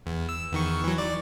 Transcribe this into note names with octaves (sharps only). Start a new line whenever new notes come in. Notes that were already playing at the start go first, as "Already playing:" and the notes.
E2
E6
E2 D#3 C#6
E3 F#3
D5